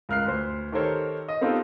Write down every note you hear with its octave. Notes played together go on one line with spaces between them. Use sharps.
C#2 A#4 F6 F#6 C7
D2 B4 C5
D#3 G4 A4 A#4 C5 C#5
D#5
B3 C4 D#4 F4 G4 A4